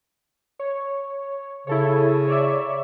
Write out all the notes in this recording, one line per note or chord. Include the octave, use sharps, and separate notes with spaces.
C#5
C#3 E4 A4 C#5
C#5 D5 E5